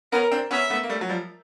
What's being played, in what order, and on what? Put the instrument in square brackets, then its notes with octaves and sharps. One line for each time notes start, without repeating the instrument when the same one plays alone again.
[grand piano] B3 C#4 [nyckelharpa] A#4
[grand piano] C4 D4
[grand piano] B3 C#4 [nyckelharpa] E5
[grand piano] A3 B3
A#3
G3 A3
F#3
F3 G3